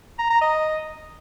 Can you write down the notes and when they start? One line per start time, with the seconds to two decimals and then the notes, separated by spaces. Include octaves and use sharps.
0.19 A#5
0.30 A#5
0.42 D#5